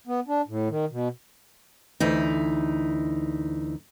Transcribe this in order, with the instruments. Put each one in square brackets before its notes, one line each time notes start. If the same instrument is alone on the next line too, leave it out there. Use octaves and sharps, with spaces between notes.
[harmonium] B3
D4
A2
D#3
B2
[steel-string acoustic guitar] D2 E3 D#4